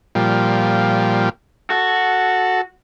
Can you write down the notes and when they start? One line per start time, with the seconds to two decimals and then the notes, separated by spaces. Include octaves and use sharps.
0.15 A#2 F3 G3
1.70 F#4 A4